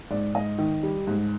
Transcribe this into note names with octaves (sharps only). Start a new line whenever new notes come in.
G#2 D5
G#2 D#5
D#3
G3
G#2